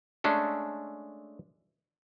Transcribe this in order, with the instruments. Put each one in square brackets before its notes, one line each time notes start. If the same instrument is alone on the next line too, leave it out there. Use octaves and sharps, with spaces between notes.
[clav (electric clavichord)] G#3 A3 C#4 D4 A4